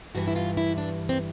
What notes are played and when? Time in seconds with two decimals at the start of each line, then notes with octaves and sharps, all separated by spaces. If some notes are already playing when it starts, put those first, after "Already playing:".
0.15 G2 E3 F#4
0.28 E4
0.36 F4
0.57 E4
0.78 D4
1.09 C4